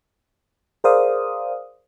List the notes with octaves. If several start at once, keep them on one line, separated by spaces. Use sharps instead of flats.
G#4 A#4 C5 D5 F5 D#6